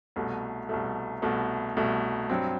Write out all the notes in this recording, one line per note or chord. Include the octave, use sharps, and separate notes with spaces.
C2 B2 A3
C2 B2 A3
C2 B2 A3
C2 B2 A3
G2 F#3 C4